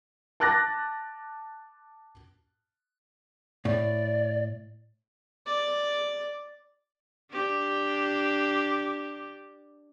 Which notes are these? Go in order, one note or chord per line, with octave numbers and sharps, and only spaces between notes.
A5 D6 F#6 A6 A#6
A2 D5
D5
D4 G4